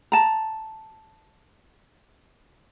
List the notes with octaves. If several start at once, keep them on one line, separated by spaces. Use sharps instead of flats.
A5 A#5